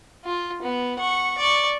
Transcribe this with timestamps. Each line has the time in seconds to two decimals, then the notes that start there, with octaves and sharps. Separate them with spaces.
0.25 F4
0.62 B3
0.99 F#5 C#6
1.38 D5 C#6